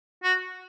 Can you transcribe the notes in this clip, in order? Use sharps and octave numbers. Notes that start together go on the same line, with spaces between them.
F#4